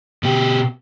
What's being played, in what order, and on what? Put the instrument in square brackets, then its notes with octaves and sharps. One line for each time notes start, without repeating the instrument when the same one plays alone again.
[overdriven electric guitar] B2 G4